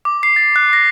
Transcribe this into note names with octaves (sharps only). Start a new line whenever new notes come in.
D6
C7
A6
F#6
A#6